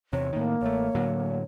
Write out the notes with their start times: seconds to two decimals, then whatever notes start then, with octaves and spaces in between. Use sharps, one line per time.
0.13 E2 C3 C#5
0.33 A2 D#3 A#3
0.61 A1 A3 C#5
0.95 A2 D3 F#3